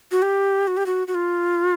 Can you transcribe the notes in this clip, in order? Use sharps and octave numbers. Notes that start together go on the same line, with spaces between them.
F#4
G4
F#4
G4
F#4
F#4
F4